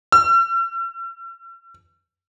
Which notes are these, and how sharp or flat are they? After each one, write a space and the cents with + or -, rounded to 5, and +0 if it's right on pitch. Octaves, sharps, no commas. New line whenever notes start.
E6 +45